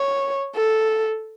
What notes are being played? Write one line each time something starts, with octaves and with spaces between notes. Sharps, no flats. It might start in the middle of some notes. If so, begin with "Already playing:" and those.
Already playing: C#5
A4